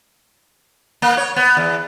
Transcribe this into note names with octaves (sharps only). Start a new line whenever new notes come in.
A#3
C#5
B3
E2